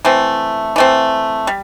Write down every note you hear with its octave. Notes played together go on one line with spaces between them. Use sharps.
E3 A3 C4
E3 A3 C4
G3